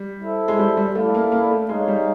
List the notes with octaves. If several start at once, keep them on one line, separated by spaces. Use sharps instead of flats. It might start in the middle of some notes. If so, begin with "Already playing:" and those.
Already playing: G3
E4 A4 C5 E5
G#3
G3
G3
A3 E4 A4 D5 F5
A#3
A#3
A3
G#3 D#4 G#4 C#5 F5
G3